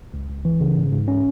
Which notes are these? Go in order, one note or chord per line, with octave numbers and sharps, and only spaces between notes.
C#2
C#2
E3
C#3
G#2
G#2
C#4